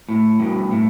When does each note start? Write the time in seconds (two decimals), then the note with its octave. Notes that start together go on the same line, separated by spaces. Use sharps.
0.09 A2
0.40 G2 B2
0.71 A2